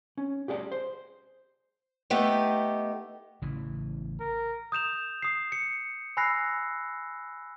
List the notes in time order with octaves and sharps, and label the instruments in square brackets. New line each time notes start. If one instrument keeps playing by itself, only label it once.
[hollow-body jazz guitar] C#4
G4 G#4 D5 F#5 A5
C5
[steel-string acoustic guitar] A3 B3 D#4 G4
[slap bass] A1 C#3 E3
[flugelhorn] A#4
[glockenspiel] D#6 G6 E7 F7
D#6 C7
C#7
G#5 B5 E6 F#6 A#6 C7